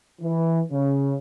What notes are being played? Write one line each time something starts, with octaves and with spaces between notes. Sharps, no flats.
E3
C#3